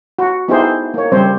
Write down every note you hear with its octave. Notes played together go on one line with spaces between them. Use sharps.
F#4
B3 D#4 E4 G4 G#4 C5
A#3 C#5
C#3 G3 C4 C5 C#5